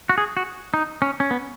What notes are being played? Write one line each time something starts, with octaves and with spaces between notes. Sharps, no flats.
F#4
G#4
F#4
D#4
C#4
C#4
B3